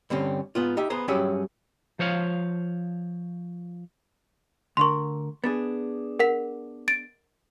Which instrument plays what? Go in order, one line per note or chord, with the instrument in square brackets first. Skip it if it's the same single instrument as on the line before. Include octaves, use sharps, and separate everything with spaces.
[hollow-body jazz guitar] G2 D3 C4 C#4
G#2 B3 F4
D#4 G4 E5
B3 G#4 C5 A#5
G2 F#3 C#4 G4 G#4 E5
[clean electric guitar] F3 C5 C#5 F5
[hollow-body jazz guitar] D2 D3 A#4 [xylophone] C6 C#6
[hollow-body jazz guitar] B3 D4 G#4 [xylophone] A6
[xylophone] A#4 F#5 B6
A6 D7